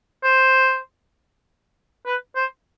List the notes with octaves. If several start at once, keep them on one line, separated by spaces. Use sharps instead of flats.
C5
B4
C5